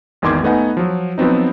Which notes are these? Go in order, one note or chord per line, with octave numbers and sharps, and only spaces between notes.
G#1 E2 D#3 C6 D6 G#6
A3 B3 D#4 F#5 G#5
F3 F#3
F3 F#3 B3 C4 D#4